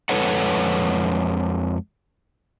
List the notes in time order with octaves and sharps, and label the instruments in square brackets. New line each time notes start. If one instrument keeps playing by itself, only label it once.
[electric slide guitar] F2 G#3 A4 B4 C#5 F#5